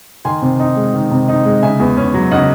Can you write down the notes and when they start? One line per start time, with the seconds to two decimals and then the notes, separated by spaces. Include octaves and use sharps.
0.25 D#3 G#5 C6
0.42 C3
0.59 D#4
0.76 G#3
0.94 D#3
1.11 C3
1.28 D#4
1.46 G#3
1.63 C#3 E5 G#5
1.80 E2
1.97 C#4
2.14 F#3
2.31 C#3 D#5 F#5